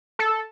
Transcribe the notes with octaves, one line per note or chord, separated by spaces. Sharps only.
A4